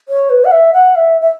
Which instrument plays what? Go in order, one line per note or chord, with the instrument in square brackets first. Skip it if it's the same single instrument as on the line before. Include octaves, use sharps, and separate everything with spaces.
[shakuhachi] C#5
B4
F#5
E5
F#5
E5
E5